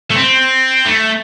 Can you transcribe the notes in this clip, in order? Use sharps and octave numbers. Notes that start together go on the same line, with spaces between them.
A3
C4
A3